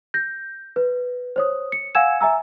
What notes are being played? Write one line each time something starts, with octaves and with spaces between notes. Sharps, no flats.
G6 A#6
B4
C5 C#5 D#6
C#7
F5 F#5 G#5 E6 G#6 E7
E5 G#5 A#5 E6